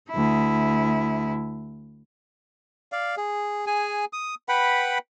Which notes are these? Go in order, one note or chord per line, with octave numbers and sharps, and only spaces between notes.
D2 E4
D5 F5
G#4
G#4 G#5
D#6
B4 F#5 G5 B5